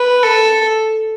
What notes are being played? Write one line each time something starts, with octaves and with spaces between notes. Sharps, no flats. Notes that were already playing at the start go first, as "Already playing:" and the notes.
Already playing: B4
A4